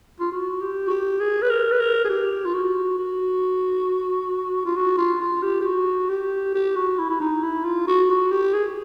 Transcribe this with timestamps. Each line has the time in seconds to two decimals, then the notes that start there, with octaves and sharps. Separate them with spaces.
0.20 F4
0.32 F#4
0.62 G4
0.87 F#4
0.90 G4
1.20 G#4
1.42 B4
1.50 A#4
1.72 B4
1.80 A#4
2.05 G#4
2.09 G4
2.45 F4
2.54 F#4
2.98 F#4
4.66 F4
4.76 F#4
4.98 F4
5.21 F4
5.43 G4
5.61 G4
5.65 F#4
6.10 G4
6.55 G4
6.76 F#4
6.99 E4
7.09 E4
7.20 D#4
7.43 E4
7.65 F4
7.87 F#4
8.10 F#4
8.31 G4
8.53 G#4